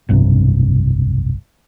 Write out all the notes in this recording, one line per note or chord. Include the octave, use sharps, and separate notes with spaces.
F1 B1 G2 C3